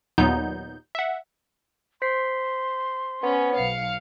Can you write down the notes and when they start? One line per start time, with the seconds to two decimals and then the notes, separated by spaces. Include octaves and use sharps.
0.18 D#2 A#2 F#3 B3 D#4 G6
0.95 E5 F#5
2.02 C5 C6 B6 C7
3.23 B3 C#4
3.56 B1 F5 C#7